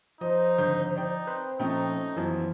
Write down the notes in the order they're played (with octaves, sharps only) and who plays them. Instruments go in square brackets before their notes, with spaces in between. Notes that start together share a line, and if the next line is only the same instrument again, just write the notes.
[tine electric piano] F3 [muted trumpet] D#4 [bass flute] C5 [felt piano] D#5
[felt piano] G#1 D3 G6
[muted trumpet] D#4 [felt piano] D5 G5
[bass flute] C4 [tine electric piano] B4 C5
[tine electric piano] A#2 F3 [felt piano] A3 C#4 G5 [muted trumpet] D#4
[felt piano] F#2 [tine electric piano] E3 F3 B3